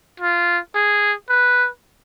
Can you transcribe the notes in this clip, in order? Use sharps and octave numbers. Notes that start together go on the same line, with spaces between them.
F4
G#4
B4